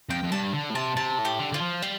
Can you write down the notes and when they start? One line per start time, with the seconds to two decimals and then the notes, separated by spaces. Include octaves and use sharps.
0.10 F2 G5
0.23 F2
0.32 G2 A5
0.54 D3
0.70 A2
0.75 C3 A5
0.96 C3 A5
1.18 A2
1.25 G4
1.39 D3
1.52 D3 F4
1.61 F3
1.82 G3 F4